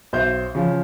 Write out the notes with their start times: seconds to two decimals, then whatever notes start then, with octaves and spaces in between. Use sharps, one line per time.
0.13 B1 C5 E5 G6
0.55 C#3 F3